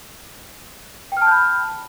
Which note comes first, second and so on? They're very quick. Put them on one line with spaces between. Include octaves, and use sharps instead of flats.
G5 F6 A5 G6 B5